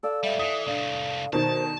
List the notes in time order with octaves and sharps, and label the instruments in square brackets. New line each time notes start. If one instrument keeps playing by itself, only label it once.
[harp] A4 D5 F5 [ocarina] E6
[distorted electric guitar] G#2 G3 [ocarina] E5
[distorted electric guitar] E3 [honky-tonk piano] D#6
[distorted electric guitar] C2 A2 [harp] D4 [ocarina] F5
[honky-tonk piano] B2 D#3 [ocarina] C5 [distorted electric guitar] A5